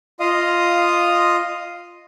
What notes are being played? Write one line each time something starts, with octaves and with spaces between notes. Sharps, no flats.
F4 D#5 F5 D#6